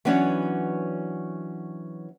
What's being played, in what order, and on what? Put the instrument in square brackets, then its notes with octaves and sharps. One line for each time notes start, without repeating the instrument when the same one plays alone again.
[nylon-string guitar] E3 F#3 B3 C#4 D4